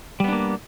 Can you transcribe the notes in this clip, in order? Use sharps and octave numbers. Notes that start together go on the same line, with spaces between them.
G3 A#3 B3 D4